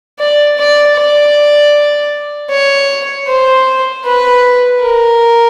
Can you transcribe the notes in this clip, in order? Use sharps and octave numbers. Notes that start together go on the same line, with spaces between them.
D5
D5
D5
C#5
C5
B4
A#4